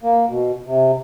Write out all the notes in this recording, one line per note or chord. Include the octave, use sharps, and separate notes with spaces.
A#3
B2
C3